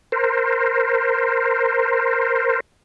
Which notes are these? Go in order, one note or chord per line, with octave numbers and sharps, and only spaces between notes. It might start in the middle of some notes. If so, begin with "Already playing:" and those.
A#4 C5